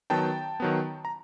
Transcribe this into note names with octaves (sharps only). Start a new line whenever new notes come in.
D#3 F#3 B3 G5 A5
D#3 F#3 B3
A#5